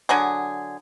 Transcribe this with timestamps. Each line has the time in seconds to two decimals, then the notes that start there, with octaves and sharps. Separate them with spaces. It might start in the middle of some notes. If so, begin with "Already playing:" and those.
0.09 D3 F#3 G#4